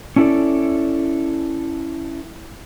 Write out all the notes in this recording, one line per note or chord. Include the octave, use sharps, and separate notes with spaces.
C#4 D4 E4 F#4 A4 D5